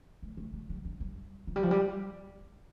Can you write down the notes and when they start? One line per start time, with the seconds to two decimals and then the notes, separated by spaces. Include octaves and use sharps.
0.22 A3
0.37 A3
0.53 A3
0.69 G3
0.85 D3
1.00 G3
1.47 F3
1.56 G3
1.63 F3
1.71 G3